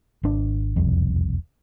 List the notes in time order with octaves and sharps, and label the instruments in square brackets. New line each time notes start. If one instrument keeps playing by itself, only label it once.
[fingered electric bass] G#1 D4
E1 C2 F2